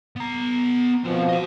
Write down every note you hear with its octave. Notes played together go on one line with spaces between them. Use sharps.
B3 A#5
B2 F3 C4 A#4
D#5 F5